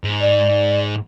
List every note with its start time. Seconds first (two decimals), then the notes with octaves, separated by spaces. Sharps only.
0.04 G#2
0.21 D5